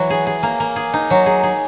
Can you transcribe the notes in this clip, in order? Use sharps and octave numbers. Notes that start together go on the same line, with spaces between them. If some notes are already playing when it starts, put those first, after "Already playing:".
Already playing: E3 F#3 F#4
G#4
G#4
A#3
A#3
G#4
D#4
F#3
G#4
G#4